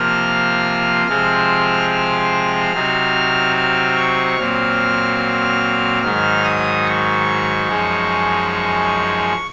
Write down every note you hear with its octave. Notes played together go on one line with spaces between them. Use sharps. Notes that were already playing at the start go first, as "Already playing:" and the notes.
Already playing: C3 F3 A#3 F4 F6
C3 F3 G#3 C4 F6
F6
C3 F#3 C4 D#4
F6
C#6
A#2 F#3 C4 F6
G#2 D#3 F#3 F6
D#6
C#6
F#2 F3 G#3 D#4